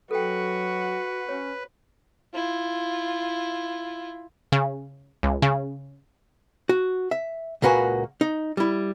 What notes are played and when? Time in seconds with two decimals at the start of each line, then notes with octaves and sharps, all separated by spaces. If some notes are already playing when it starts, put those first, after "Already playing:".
0.11 F#3 F#4 A4 B4 G5
1.29 C#4 C#5
2.34 E4 F4
4.52 C#3
5.23 C#2
5.42 C#3
6.69 F#4
7.11 E5
7.62 C#2 A#2 A#3 F#4 B4 G#5
8.21 D#4
8.57 G3 E4